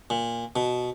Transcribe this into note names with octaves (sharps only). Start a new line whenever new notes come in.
A#2
B2